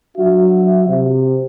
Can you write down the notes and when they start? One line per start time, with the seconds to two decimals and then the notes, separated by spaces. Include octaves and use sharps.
0.17 F#3 D4 F#4 E5
0.88 C3